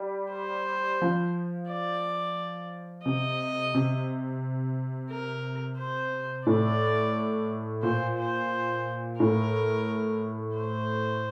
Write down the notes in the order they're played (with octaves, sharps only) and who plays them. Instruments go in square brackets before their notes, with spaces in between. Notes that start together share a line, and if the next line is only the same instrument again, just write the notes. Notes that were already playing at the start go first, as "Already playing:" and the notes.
Already playing: [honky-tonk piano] G3
[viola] C5
[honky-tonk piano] F3
[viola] D5
[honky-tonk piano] C3 [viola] D#5
[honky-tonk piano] C3
[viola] A#4
C5
[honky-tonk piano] A2 [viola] D5
[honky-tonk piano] A#2 [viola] C5
[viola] C5
[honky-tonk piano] A2 [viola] A#4
[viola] C5